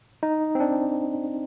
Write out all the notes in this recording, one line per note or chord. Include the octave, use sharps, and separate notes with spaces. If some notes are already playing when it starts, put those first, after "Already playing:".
D#4
C4
D4